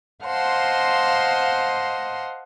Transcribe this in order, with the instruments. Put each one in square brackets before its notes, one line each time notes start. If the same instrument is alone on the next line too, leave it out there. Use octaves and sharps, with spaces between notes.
[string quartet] C5 D#5 F5 F#5 A5 C6